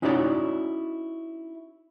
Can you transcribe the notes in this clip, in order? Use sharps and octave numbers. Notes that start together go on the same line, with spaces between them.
C#4 D#4 E4 F#4 C#5 D5